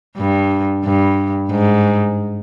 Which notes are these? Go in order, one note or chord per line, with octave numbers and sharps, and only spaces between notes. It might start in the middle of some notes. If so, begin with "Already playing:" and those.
G2
G2
G#2